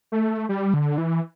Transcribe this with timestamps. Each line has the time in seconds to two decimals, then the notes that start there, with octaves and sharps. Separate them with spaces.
0.12 A3
0.49 G3
0.74 D3
0.98 E3